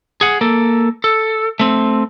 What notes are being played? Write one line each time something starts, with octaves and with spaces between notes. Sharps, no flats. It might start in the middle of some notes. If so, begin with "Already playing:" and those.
G#4 F#5
A#3 A4
A4
A3 C4